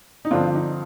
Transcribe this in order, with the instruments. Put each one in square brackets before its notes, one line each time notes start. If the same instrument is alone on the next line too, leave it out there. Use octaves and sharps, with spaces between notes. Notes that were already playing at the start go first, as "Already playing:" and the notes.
[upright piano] D#4
G2 D3 F3 C4 D4 F4
D#4